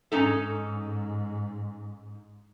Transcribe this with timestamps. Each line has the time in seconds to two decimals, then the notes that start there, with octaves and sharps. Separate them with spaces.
0.12 G#2 C#4 D#4 A4